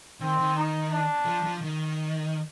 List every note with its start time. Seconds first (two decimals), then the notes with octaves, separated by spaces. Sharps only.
0.20 D#3 C4
0.38 D#3
0.56 D#4
0.91 D4
1.25 F3
1.44 F3
1.61 D#3